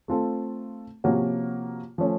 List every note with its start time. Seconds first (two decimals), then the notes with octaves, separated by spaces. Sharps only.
0.08 A3 C4 F4 A4
1.04 C3 F3 A#3 C#4 F#4
1.98 F3 A3 C#4